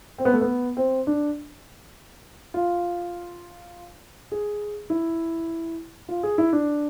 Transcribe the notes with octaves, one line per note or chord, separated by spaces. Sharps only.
C4
B3
A3
B3
C4
D4
F4
G#4
E4
F4
G#4
E4
D4